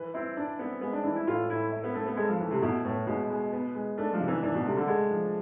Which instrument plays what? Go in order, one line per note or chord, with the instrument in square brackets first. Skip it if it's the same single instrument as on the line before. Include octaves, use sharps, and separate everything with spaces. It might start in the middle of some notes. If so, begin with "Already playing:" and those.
Already playing: [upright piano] E3 B4
[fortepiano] C4 [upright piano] E4
[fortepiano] D4 [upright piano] D5
[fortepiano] B3 [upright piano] C4
[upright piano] G#3 [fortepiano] B3
[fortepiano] D4
[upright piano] E3 [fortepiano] D4
[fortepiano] E4
[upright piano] A2 [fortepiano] F4
[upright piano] A2 [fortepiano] E4
[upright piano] E4
[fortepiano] B3
[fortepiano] A3 [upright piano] C4
[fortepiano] B3
[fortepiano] G#3 [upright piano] A4
[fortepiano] F3
[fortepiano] E3 [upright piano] A3
[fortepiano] C3
[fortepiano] B2 [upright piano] E4
[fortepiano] A2 [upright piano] B3
[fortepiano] B2 [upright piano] G#3
[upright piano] G#3
B3
G#3
[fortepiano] A3 [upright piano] D4
[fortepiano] F3
[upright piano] C3
[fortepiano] E3
[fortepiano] E3 [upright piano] D4
[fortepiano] B2
[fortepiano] C3 [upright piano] A3
[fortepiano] D3
[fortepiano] G#3 [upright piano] A4
[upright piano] F3